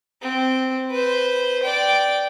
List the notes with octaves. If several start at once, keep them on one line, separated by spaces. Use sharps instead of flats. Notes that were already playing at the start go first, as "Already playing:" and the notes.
C4
B4 C5
D5 G5